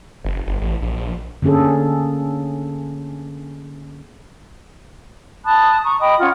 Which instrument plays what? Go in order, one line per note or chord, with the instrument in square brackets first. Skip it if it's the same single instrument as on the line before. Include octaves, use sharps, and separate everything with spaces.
[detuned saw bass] F#1
G1
A1
A#1
A#1
[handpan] D3 A#3 C#4 G#4 A4
[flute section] A5 B5 D#6 F#6
A#5 C#6 D#6
D#5 G5 B5 D#6
C#4 F4 F#5